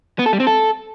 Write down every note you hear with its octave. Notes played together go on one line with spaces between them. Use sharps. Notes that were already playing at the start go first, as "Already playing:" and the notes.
B3
A4
G3
C4
A4